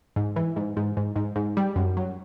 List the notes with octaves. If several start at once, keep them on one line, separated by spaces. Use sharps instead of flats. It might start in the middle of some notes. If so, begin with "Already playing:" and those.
G#2
E3
G#2
G#2
G#2
G#2
G#2
G3
F#2
F#3